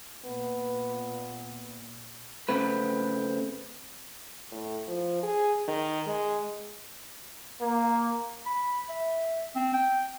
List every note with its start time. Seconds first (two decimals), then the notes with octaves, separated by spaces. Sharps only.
0.25 A#2 B3
2.49 C#3 A3 C4 B4
4.51 A2
4.88 F3
5.23 G#4
5.68 D#3
6.06 G#3
7.61 A#3
8.46 B5
8.89 E5
9.55 C4
9.74 G5